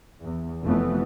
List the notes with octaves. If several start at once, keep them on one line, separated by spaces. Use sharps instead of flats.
E2
F1 F2 E3 A3 B3